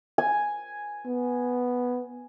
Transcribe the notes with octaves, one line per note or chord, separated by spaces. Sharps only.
G#5
B3